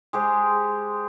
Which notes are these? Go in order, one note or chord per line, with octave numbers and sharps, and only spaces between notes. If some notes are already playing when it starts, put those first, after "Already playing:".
G#3 G4 C5